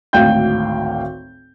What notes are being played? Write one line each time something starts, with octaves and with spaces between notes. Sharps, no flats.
G#1 D2 A2 F5 G5 G6